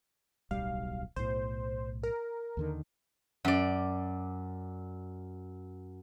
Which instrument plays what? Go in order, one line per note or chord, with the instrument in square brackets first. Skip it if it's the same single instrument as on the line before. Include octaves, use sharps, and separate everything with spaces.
[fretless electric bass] D1 B1 G3 [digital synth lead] F5
[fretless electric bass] B1 A2 [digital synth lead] C5
[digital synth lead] A#4
[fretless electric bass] D#2 D3 D#3
[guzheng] F#2 D5